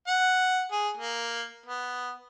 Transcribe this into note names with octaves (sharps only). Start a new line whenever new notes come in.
F#5
G#4
A#3
B3